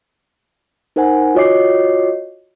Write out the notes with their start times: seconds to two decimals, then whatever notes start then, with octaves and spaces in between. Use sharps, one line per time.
0.96 D#4 A#4 C5 F#5 G#5
1.35 F4 F#4 C#5 D#5 D6 C7